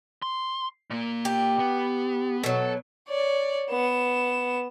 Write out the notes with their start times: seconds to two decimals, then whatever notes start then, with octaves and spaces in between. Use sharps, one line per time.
0.22 C6
0.90 A#2 A#3
1.25 G4
1.59 B3
2.44 B2 F#3 A4
3.09 C#5 D5
3.70 B3 E7